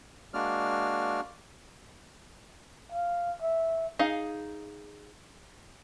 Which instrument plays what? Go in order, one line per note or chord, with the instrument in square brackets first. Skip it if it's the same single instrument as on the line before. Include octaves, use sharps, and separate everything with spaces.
[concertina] G#3 A#3 D4 F#4 D5 F6
[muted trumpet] F5
E5
[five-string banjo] D#4 G#4 F5